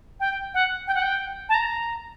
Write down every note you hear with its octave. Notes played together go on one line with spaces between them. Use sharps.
G5
F#5
G5
F#5
G5
A5
A#5